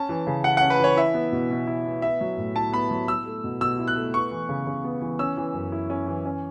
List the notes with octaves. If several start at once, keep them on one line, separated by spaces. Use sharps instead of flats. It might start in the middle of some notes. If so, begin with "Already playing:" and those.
Already playing: C#4 A5
E3
C#3
E4 F#5
F#5
C#4
B4
E3 C#5
E4 E5
B3
B2
B2
E4
B3
B3 E5
F#3
A2
E4 A5
B3 B5
F#3
E4 E6
A3
B2
B2 E6
E4
F#6
A3
B3 C#6
E3
C#3
C#3
B3
E3
C#4 E6
E3
F#2
E4
C#4
E3
C#4